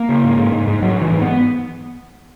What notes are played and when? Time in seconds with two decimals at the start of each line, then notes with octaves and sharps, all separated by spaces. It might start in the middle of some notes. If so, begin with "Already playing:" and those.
Already playing: A#3
0.09 C#3
0.24 G#2
0.38 G#2
0.52 G#2
0.67 G#2
0.82 G#2 F#3
0.97 G#2 E3
1.12 G#2
1.22 B3